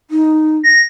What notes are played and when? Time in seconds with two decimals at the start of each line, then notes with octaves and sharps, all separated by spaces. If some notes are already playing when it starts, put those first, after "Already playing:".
0.11 D#4
0.63 A#6